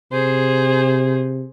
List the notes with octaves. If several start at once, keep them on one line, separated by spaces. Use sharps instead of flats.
C3 G#4 C5